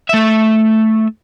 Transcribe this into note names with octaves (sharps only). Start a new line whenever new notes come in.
A3 E5